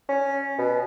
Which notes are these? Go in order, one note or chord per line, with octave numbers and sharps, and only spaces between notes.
C#4
B2